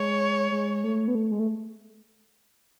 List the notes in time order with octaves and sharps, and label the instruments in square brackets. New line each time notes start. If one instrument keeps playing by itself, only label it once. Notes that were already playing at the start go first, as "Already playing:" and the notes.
Already playing: [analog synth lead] G#3 [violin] C#5
[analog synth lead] G#3
A3
B3
A3
G#3
A3